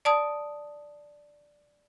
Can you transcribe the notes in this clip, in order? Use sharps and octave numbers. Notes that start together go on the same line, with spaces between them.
D5 A5 D#6